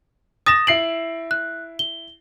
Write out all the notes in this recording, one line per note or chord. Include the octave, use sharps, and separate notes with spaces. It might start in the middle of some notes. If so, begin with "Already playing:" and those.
D#6 A6 A#6 E7
E4 C7 D7 F#7
F#6
G7